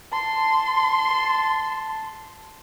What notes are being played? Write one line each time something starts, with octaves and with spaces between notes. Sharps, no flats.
A5 C6